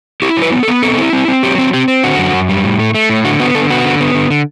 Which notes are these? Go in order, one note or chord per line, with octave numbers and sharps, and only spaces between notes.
E4 G4
F#3
B4
B3
A4
B3
C4 A4
E4
C4
C4
F#3 G4
C4
C4 G4
C4
D3 F#4
F#2
F#2
G3
A2
A3
A3
A2
D3 F#4
B3 F#4
D3 A4
B3 F#4
D3
B3
D3
D3